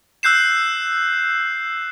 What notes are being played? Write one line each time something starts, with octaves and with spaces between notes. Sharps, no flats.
E6 F#6 G6 C7 E7